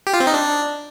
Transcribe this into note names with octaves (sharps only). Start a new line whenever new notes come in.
G4
F4
C4
D#4
D4